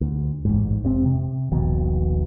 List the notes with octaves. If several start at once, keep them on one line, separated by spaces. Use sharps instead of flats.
D2
A1 G#2
F1 C3 C4
C3
D#1 A#1 B2 D#3